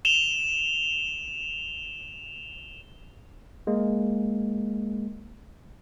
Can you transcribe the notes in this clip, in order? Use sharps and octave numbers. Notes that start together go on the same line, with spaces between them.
E7 F7 G7
G#3 A#3